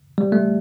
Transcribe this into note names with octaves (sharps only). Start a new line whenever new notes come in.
G3
A3